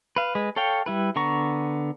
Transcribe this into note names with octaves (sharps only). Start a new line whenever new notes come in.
B4 F5
G#3 B4
A4 C#5 F5 G5
G3 E4 B4
D3 B3 A#5 C#6